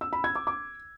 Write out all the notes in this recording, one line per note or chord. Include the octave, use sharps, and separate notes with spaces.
E6
B5
G#6
D6
D6